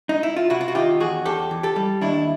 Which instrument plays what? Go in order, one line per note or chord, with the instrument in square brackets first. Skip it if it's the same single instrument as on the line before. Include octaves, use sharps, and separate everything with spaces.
[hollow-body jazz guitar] D#4
E4
F4
C3 E4 F#4
F4
F#4
D#3 F4 G4
E2 F#4 G#4
E2 G4 A4
E3
G4 A4
G3
D#2 D4 E4